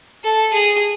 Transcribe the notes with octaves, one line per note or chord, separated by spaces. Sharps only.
A4
G#4